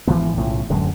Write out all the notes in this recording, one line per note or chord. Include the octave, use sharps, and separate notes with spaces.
G#1 E3 F3 B3
B1 A2 C#3 F3
D1 F#2 D3 G#3